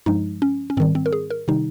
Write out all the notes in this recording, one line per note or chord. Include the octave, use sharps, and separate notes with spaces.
G2 F3 G#3 D#4
C#4
C#4
G#2 D#3 G3 C4
C4
A#4
G#4
A#4
C3 D#3 G3 D#4